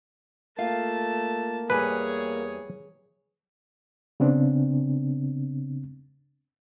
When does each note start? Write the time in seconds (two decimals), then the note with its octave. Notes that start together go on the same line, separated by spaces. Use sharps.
0.58 A3 A#3 F4 F5 A5
1.70 E2 G3 G#4 B4 C#5 G#5
4.20 C#3 B3 C4 D4